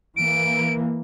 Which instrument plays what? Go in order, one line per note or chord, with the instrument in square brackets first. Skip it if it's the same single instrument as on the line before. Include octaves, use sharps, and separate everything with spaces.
[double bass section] E3 A#3 [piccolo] D7